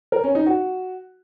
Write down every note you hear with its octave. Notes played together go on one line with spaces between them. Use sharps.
A#4
C#4
D#4
F#4